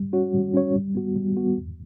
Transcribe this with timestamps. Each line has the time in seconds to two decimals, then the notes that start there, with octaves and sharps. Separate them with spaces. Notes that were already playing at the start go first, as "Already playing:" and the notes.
Already playing: G3
0.13 C#4 F#4 C#5
0.33 G3
0.54 C#4 F#4 C#5
0.74 G3
0.95 B3 F#4
1.16 G3
1.37 B3 F#4
1.57 E2